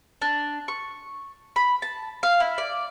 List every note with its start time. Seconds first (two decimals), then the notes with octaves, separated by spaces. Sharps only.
0.22 D4
0.68 C#6
1.56 B5
1.82 A5
2.23 F5
2.40 E4
2.58 D5